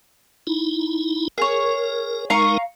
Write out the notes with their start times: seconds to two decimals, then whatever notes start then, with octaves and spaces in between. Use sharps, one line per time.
0.47 D#4 E4
1.38 G#4 A#4 C#5
2.30 G#3 D#4 A#4 F5 A#5 C#6